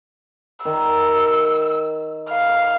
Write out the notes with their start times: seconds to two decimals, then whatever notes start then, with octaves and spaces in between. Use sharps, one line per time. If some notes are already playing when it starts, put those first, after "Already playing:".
0.65 D#3 E6
2.30 F5